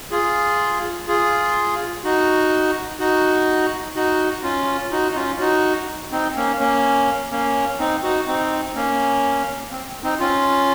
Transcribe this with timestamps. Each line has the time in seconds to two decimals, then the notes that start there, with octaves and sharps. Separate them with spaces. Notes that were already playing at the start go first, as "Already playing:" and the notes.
0.11 F4 G#4
1.08 F4 G#4
2.04 D#4 F#4
2.99 D#4 F#4
3.96 D#4 F#4
4.43 C#4 F4
4.91 D#4 F#4
5.12 D#4
5.15 C#4 F4
5.40 D#4 F#4
6.11 C4 D#4
6.36 A#3 C#4
6.60 A#3 C#4
7.31 A#3 C#4
7.79 C4 D#4
8.03 D#4 F#4
8.27 C4 D#4
8.75 A#3 C#4
9.71 C4
10.03 C4 D#4
10.19 C#4 F4